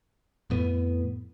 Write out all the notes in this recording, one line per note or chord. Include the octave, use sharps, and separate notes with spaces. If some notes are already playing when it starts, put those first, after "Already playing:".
F2 A2 B3